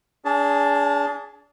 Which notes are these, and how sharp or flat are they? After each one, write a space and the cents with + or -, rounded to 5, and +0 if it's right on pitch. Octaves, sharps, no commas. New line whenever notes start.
D4 -40 G#4 +0 A5 +0